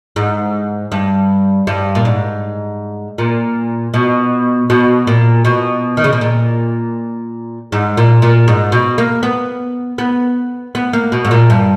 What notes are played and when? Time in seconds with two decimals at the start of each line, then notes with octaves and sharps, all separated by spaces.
0.16 G#2
0.92 G2
1.67 G2
1.95 A#2
2.05 G#2
3.18 A#2
3.94 B2
4.70 B2
5.07 A#2
5.45 B2
5.97 D#3
6.04 C#3
6.13 B2
6.21 A#2
7.72 G#2
7.97 A#2
8.22 A#2
8.48 G#2
8.72 B2
8.98 A#3
9.23 B3
9.98 B3
10.75 B3
10.93 A#3
11.12 B2
11.25 G#2
11.31 A#2
11.50 G2